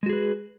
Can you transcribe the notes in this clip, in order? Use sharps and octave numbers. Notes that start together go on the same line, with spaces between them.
G#3 F#4 G#4 B4